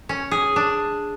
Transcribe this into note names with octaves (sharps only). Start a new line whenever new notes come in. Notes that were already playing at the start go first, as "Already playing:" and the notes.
C#4
G#4
D4